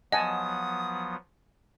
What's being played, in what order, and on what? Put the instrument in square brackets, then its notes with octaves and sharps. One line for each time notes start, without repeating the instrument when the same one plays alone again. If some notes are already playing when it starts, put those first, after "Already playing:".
[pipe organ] F3 F#3 B3 [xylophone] D#5 [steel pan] F#5 G#5 A5 [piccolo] D#6